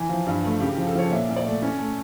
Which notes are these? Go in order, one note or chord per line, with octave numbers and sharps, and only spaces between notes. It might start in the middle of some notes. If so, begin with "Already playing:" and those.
Already playing: E3
F3
G2
A3
C#3 G4
G4
F3
A4
F3 C#5
A#2 E5
A#2
D5
A3
C#4
A3